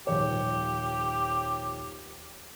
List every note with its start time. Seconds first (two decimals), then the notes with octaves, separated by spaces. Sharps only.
0.07 D#1 F3 G4 C#5